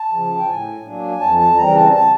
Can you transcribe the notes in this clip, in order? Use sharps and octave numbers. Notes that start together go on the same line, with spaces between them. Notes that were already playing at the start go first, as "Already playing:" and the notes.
Already playing: A5
C#3 F3
G5
A2 G#5
F#3 A#3 D4
F2 A5
A5
C#3 E3 G3 C4 A#5
A5
A5